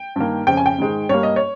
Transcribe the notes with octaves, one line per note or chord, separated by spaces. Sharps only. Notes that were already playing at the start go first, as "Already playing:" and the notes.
Already playing: G5
G2 D#3 A#3
F2 C#3 F3 G5
G#5
G5
G#2 D#3 G#3
G2 G3 A#3 C#5
D#5
C#5